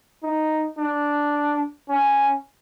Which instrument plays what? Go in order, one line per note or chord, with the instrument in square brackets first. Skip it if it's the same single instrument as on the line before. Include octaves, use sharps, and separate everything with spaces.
[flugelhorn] D#4
D4
C#4